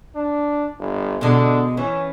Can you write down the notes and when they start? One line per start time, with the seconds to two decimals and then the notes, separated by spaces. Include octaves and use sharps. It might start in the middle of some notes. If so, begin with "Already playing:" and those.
0.15 D4
0.79 G1
1.21 B2 D3 G#3
1.77 E3 C#4